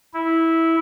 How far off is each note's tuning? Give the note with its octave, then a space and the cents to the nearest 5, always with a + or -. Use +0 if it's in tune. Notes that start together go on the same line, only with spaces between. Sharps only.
E4 -10